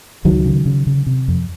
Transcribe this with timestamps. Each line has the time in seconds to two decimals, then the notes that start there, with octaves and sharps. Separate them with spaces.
0.25 C#2 D#3 F#3
0.46 C#3
0.66 C#3
0.87 C#3
1.06 C3
1.28 F2